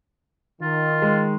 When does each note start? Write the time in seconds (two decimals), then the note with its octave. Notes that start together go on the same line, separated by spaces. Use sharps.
0.62 D#3 F4
1.02 G#3